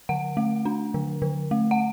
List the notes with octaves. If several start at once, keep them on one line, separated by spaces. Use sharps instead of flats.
D3 F#5
A3
D4
D3
D3
A3
F#5